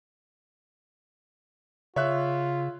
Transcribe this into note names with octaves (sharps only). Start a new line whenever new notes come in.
C#3 F4 C#5 E5 F#6